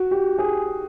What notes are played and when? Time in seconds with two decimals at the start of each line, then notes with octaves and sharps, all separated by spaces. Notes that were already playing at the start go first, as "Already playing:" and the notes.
Already playing: F#4
0.11 G4
0.38 G#4